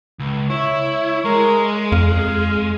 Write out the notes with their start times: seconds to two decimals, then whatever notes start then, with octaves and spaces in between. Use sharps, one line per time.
0.19 C#2
0.50 E4 C#5
1.25 G#3 A#4
1.92 F2 F5